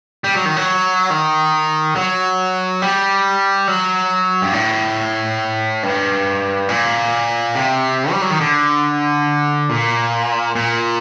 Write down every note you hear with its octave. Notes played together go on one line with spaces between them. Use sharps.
G3
F#3
D#3
F#3
D#3
F#3
G3
F#3
G2
A2
G2
A#2
C3
G3
F#3
D#3
D3
A#2
A#2